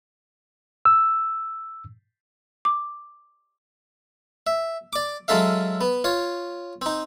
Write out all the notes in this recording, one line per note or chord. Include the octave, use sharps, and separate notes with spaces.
E6
D6
E5
D5 D6
F#3 G#3 C#4 A4 E5 F5
B3
F4 C#5
C4 D#4